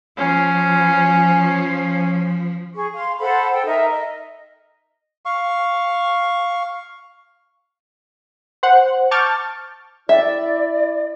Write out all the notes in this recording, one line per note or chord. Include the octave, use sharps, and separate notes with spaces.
F3 C#4
G#4 C#6
F5 C6
A4 C5 F#5 B5
A4 G5
D#4 A#4 E5
D#5
F5 C#6
C5 F#5
A5 C#6 D6 F6 G6 A6
E4 D5 E5